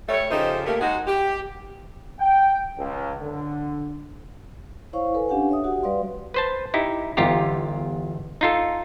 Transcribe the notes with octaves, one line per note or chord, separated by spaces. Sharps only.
G3 A3 C#5
C#3 F3 D#4 G4 A4 C5
A3 A#3 G4
G#3 D#4 F#4
G4
G5
C#2
D3
E4 C5 C#5 F5 C#6
A4 B4 G#5
C#4 D4 G4 F5 F#5 G#5
C#5 E5 D#6
F#4 G4 F#5
G3 B4 D5 F5 C6
B4 C5 A5
D#4 E4 G4
G1 E2 D#4 F4 G4 A#5
D#4 F4 A4